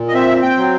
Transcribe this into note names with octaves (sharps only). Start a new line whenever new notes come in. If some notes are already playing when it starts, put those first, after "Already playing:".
Already playing: A#2
D#5
C4 E5
G5
F#3